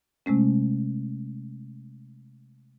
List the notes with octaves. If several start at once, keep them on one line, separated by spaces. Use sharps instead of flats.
C3 G#3 A3 C#4